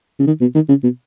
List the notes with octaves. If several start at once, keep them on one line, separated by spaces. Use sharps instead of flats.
C#3
D#3
B2
D#3
C#3
B2